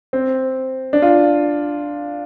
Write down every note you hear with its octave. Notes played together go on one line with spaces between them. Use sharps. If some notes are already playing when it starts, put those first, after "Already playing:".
C4
D4
F4